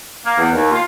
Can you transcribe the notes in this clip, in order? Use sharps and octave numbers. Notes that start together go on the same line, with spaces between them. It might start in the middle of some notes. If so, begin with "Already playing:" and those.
A#3
E2
D#2
F4